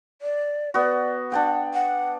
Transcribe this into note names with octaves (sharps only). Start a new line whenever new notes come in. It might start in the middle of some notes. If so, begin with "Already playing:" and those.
D5
B3 F#4 D5
D4 D5 F#5 G5
F#5